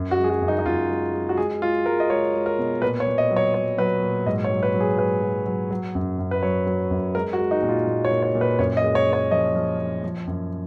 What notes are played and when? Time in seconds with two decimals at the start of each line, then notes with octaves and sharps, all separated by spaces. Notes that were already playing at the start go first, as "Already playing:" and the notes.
Already playing: F#2
0.11 F#4
0.18 G#3
0.24 G#4
0.29 F#4
0.42 F#2
0.48 D#4
0.59 D#4
0.66 F#2 F4
0.90 G#3
1.14 G#3
1.29 F#4
1.37 G#3 G#4
1.62 G#3 F4
1.86 G#3 A#4
2.00 D#5
2.10 G#3 C#5
2.34 G#3
2.46 A#4
2.58 B2
2.82 A#2 B4
3.00 C#5
3.07 A#2
3.18 D#5
3.31 F#3
3.36 C#5
3.54 F#3 C#5
3.78 F#3 B4
4.02 A#2
4.26 G#2 D#5
4.44 C#5
4.50 F#3
4.63 B4
4.75 F#3
4.80 G#4
4.98 G#2 B4
5.23 F#3
5.47 F#3
5.71 F#3
5.95 F#2
6.19 F#2
6.31 B4
6.42 F#3 C#5
6.67 F#3
6.91 F#2
7.15 G#3 A#4
7.33 F#4
7.39 G#3
7.51 D#4
7.63 A#2
7.69 F4
7.87 A#2
8.05 C#5
8.11 A#2
8.23 C#5
8.35 A#2
8.41 B4
8.59 F#2 C#5
8.77 D#5
8.83 G#3
8.95 C#5
9.07 G#3
9.13 C#5
9.31 F3 D#5
9.55 F3
9.79 F3
10.04 F3
10.27 F#2